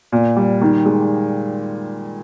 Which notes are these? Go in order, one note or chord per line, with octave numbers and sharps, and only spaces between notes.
A#2
G3
D#3
G#3